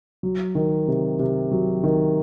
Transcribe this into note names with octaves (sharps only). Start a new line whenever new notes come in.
F#3
D#3
C3
C3
F#3
D#3